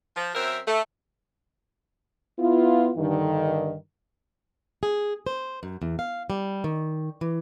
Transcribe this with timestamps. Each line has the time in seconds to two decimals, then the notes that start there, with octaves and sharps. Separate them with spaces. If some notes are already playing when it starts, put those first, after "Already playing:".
0.16 F3
0.35 F#2 C4 A#4 E5
0.67 A3
2.39 B3 E4 F4
2.97 G2 D3 D#3
4.83 G#4
5.26 C5
5.63 F#2
5.82 E2
5.99 F5
6.30 G3
6.64 D#3
7.21 E3